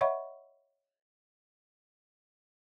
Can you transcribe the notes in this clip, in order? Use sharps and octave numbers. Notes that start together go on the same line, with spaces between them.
C#5 D#5 E5 F#5 B5 C#6